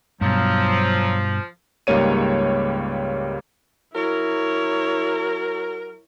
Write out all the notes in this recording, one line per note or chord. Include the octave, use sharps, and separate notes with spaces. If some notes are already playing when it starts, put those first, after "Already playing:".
G2 B2 F3 F#3
C#2 G#2 G3 A#3 C#5 D#7
F#3 E4 A#4 C#5